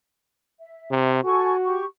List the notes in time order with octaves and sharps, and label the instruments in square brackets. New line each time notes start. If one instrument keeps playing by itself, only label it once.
[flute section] E5
[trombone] C3
[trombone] F#4 [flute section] A4 G#5 C#6
[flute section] G4 C#6